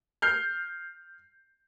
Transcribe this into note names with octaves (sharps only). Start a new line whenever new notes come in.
F6 G6 C7